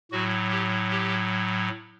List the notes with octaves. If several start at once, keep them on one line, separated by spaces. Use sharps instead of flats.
A2 F#3 F#4
G4
G4